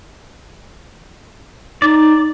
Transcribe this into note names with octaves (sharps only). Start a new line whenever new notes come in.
D#4 D5